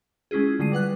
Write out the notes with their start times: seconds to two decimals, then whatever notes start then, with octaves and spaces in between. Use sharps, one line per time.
0.31 G#3 C#4 E4 F4 G#4
0.59 D3 F#3 G#3 G#4 C7 D#7
0.72 G3 B4 F#5 F#6